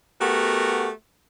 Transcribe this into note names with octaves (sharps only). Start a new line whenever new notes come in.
A3 B3 F#4 G4 A#4